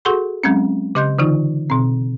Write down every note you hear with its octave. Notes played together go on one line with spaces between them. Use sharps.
F#4 G#4 A4 F#5 C6 C#6
F#3 G#3 C4 C#4
C#3 G4 D#5 C6 F#6 G6
D3 E3 D#4 F4
B2 C4